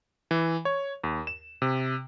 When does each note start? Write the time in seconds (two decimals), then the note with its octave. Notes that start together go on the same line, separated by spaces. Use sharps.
0.31 E3
0.65 C#5
1.04 D#2
1.27 E7
1.62 C3